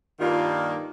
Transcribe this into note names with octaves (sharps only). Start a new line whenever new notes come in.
G2 D#3 G3 A#3 F4